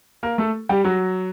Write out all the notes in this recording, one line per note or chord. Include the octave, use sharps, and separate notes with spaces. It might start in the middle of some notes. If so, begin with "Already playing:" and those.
A#3 A#4
A3 A4
G3 G4
F#3 F#4